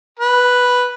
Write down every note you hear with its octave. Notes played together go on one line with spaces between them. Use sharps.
B4